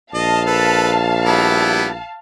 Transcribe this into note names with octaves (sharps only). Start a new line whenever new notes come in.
A#1 D#5 F5 A5
A4 B4
G3 B3 E4